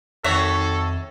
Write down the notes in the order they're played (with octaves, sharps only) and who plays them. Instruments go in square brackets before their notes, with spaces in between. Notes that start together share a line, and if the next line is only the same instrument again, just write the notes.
[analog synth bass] F2 [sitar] D#3 C#5 E5 [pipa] F#4 [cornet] A4